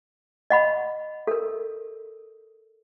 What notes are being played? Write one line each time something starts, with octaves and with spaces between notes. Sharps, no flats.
D#5 F#5 B5
A4 A#4